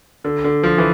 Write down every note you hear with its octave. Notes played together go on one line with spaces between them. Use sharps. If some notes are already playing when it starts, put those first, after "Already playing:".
D3
D3
F3
E3